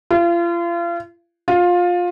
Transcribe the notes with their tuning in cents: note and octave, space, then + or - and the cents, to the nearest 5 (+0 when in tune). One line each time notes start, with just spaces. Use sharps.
F4 -35
F4 +20